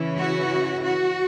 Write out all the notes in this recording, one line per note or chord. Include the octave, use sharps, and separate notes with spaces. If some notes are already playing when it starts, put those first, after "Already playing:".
Already playing: C#3 E3 C#4 E4
F#4
F#4